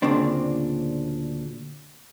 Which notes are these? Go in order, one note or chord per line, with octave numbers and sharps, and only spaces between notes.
D2 A#2 C#3 C4 D4